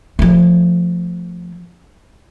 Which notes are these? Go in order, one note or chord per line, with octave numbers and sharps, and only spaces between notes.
F3 A3